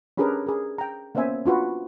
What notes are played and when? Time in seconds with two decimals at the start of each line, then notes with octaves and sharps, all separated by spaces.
0.17 C#4 D4 G4 G#4 A#4 B4
0.47 G#4 A#4
0.78 G5 A#5
1.15 A#3 B3 C#4 C5 E5 G#5
1.46 D4 F4 F#4 B4